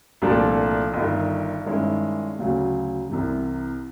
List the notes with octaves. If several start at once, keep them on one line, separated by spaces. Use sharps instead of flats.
C2 A#2 F3 A3 D4
G1 G2 D#3
G2 D#3 G#3 C#4 E4
D2 C#3 F#3
C2 C3 E3